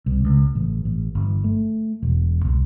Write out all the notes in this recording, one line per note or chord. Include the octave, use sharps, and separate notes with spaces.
C2
C#2
A1
A1
G1
A3
E1
C2